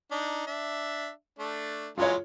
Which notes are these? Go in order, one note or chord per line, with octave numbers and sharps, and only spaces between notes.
D4 D#4
D4 E5
A3 D4
E3 F#3 G#3 F4 C#5